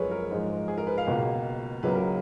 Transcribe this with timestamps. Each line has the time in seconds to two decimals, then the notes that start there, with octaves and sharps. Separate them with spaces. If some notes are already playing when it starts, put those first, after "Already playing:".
Already playing: F#2 F3 G#3 G#4 A#4 B4 C#5
0.11 A#4
0.31 G#2 F3 G#3
0.68 G#4
0.78 A#4
0.87 B4
0.98 F5
1.07 C#2 B2 A#3
1.83 C#2 C#3 F#3 A#3 B4
1.95 A#4